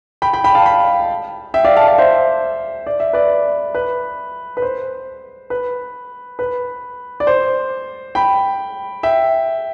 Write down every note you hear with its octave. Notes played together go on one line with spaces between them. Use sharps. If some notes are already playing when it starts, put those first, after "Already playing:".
G5 B5
G5 B5
G5 B5
F5 A5
G5 B5
E5 G5
D5 F5
F5 A5
F5 A5
C5 E5
D5
E5
B4 D5
B4
B4
C5
B4
B4
D5
C5
G5 B5
E5 G5